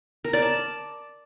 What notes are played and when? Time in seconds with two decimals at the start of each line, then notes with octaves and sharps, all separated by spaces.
0.25 A#4
0.33 D5
0.42 A5